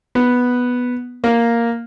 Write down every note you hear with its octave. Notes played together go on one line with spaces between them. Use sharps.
B3
A#3